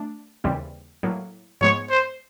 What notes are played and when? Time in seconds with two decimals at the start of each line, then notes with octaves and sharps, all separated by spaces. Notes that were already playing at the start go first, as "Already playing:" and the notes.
Already playing: A3 D4
0.44 D#2 C#3 E3 G3 C4
1.03 A2 F#3 A#3
1.61 G#2 F3 G#3 B3 C#5
1.90 C5